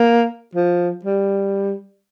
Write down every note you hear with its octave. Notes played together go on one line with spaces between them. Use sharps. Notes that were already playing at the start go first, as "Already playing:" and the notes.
Already playing: A#3
F3
G3